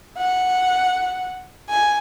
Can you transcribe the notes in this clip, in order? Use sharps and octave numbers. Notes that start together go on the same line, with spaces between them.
F#5
G#5